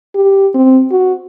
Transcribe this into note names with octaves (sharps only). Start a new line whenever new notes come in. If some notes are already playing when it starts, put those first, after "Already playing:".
G4
C4
F#4